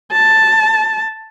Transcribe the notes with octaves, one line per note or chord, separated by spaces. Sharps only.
A5